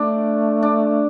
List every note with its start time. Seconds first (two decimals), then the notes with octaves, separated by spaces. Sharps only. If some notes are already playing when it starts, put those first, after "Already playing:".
Already playing: A3 D4
0.62 D4